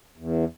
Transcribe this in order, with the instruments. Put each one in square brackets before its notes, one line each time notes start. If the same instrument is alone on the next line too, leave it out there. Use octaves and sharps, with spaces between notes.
[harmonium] E2